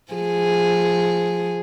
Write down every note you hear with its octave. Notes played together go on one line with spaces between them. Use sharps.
F3 G#4